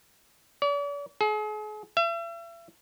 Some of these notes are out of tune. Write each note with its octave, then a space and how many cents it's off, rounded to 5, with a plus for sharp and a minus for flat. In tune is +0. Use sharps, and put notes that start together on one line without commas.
D5 -45
G#4 +40
E5 +40